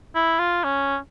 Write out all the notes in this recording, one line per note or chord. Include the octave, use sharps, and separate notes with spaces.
E4
F4
C#4